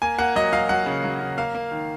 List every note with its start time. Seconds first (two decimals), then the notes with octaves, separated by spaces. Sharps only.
0.02 A#3 G#5
0.19 A#3 F#5
0.36 F#3 D#5
0.53 F#3 F5
0.69 F#3 F#5
0.86 C#3
1.04 F#3
1.21 C#3
1.38 A#3 F5
1.55 A#3
1.71 D#3